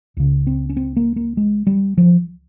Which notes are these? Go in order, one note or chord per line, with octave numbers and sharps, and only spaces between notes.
C#2 C#3
C4
C#4
C4
A#3
A#3
G#3
G3
F3